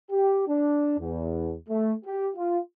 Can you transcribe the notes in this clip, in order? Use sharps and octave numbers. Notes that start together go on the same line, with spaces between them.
G4
D4
E2
A3
G4
F4